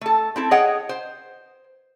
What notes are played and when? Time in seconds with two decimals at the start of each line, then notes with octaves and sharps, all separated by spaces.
0.01 A3 A4
0.36 C4 E4 A4
0.51 G#4 C#5 D#5 F#5 G5
0.89 C5